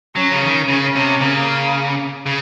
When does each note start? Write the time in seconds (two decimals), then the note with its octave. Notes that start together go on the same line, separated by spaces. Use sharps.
0.16 F#3 C#4
0.32 C#3
0.42 D#3
0.68 C#3 C#4
0.96 C3
1.21 C#3 A#3
2.26 C#3